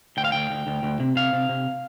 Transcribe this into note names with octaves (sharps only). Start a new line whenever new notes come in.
D2 G5
F5
D2 G5
D2
D2
D2
C3
C3 F5
C3
C3